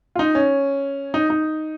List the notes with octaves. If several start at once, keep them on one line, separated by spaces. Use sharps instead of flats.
F4
D#4
C#4
D#4
D#4